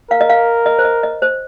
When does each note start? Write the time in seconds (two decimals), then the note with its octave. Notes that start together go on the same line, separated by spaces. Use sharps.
0.11 A#4 F5
0.21 D#5
0.30 F5
0.66 D#5
0.79 C5
0.85 D#5
1.03 D#5
1.22 C5